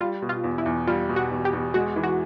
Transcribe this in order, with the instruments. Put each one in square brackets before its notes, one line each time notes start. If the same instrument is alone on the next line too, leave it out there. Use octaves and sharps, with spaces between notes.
[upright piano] G3 [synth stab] F4
[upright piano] B2
[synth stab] F4
[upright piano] E2
[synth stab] E4
[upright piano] E2
[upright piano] G3 [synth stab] F4
[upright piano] B2
[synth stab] F#4
[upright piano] E2
[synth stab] G4
[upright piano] E2
[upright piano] G#3 [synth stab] F#4
[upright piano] E3
[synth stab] F#4